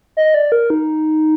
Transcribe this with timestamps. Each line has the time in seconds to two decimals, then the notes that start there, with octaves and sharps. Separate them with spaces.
0.17 D#5
0.34 D5
0.52 A#4
0.70 D#4